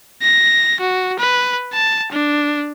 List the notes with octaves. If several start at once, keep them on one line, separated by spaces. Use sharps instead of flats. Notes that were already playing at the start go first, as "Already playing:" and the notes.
A#6
F#4
B4
A5
D4